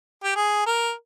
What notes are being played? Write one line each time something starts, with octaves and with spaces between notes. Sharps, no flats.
G4
G#4
A#4